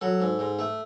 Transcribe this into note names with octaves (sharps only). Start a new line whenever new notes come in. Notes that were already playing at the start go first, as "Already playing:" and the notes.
F#3 A4
G#2
G#2
A3